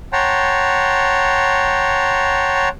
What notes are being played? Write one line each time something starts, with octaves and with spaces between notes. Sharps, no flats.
C#5 F#5 G5 A5 A#5 C6